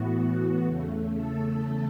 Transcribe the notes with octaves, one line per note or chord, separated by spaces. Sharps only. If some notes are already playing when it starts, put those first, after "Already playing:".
Already playing: A2 E3 B3 F#4
E2 C#3 A3
A4